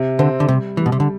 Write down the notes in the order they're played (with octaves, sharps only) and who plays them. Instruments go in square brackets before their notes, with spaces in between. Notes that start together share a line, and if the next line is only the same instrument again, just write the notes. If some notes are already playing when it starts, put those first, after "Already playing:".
Already playing: [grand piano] C3
[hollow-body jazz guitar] D3 [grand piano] C4
[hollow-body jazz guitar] D3
[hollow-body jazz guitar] C3 [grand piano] G3
[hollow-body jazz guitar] E3 [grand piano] G3
[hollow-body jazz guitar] B2
C3
D3